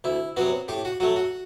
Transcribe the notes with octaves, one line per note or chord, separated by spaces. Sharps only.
D2 E4
C3 F#3 B3 F#4
A2 G4
F#4
F#3 A3 F#4
F#4